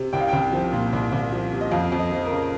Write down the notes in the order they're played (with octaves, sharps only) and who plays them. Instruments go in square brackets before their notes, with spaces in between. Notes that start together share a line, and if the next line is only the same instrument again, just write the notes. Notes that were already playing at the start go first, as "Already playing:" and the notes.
Already playing: [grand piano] C3
C2 G5
F5
C2 G5
F3
A#2
C2
C2
F3
C3
D#5
F2 F5
F2
D#5
F3
A#4
C#3